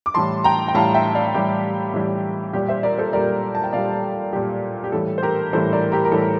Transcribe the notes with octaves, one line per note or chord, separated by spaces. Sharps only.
D6
A2 E3 G3 A5 C6
G5 A#5
G5
A2 E3 G3 F5 A5
E5 G5
D5 F5
A2 E3 G3 G4
A2 E3 G3
A#2 G3 G4
C5 E5
A#4 D5
A4 C5
A#2 G3 A#4 D5
A5
G5
A#2 G3 D5 F5
A#2 G3 G4
G4
A2 E3 G3 A4
C5
G4 A#4
A2 E3 G3 A4 C5
A#4 D5
G4 A#4
A#4
A2 E3 G3 A4